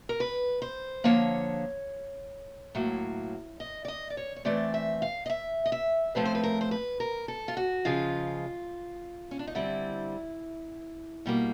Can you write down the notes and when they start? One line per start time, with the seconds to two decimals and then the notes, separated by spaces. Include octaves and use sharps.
0.09 A#4
0.20 B4
0.62 C5
1.04 D3 F3 A#3 C#5
2.75 A2 F#3 A#3
3.60 D#5
3.85 D5
3.88 D#5
4.10 D5
4.17 C#5
4.36 C#5
4.45 E3 A3 C4 D5
4.74 E5
5.02 F5
5.26 D#5
5.30 E5
5.66 D#5
5.72 E5
6.15 A2 F3 A3 C4 B4
6.25 C5
6.35 B4
6.43 A#4
6.61 C5
6.71 B4
7.00 A#4
7.28 A4
7.48 F4
7.57 F#4
7.85 C#3 F3 G#3 F4
9.31 C#4
9.39 D4
9.47 D#4
9.55 D3 G3 C4 E4
11.26 B2 G3 A#3